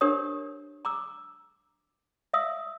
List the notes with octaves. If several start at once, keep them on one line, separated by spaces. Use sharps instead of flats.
D4 G4 A#4 C5 C#5 D#6
A#5 D6 E6
E5 F5 D#6 E6